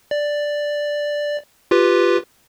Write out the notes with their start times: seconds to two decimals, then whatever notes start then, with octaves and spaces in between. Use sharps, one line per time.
0.11 D5
1.71 F4 G4 B4